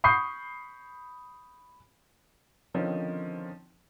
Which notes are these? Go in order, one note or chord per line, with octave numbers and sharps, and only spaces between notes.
B5 C#6 D#6 G6 C7
D3 D#3 F3 C4 C#4 D#4